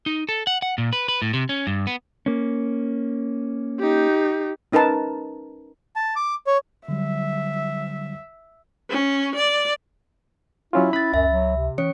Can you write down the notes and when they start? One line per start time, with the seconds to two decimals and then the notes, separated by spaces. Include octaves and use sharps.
0.06 D#4
0.29 A4
0.47 F#5
0.62 F#5
0.78 A#2
0.93 B4
1.08 B4
1.22 A2
1.34 C3
1.49 C#4
1.67 G2
1.87 B3
2.26 A#3 C#4
3.80 D#4 G4
4.72 C#4 D#4 A#4 B4 A5
5.96 A5
6.16 D6
6.47 C#5
6.88 D3 F#3 G3 E5
8.90 C#4
9.35 D5
10.73 F#3 C#4 E4 F4
10.93 C#4 B5 A6
11.14 C#2 F#2 E5
11.30 F#3
11.57 C3
11.78 E3 C#4 C#5 C#7